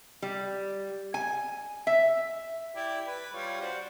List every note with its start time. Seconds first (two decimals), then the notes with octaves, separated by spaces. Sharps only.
0.22 G3
1.14 G#5
1.87 E5
2.75 E4 G4 D5
3.07 B4
3.33 G3 F4 C#5
3.61 D4 F#4 C5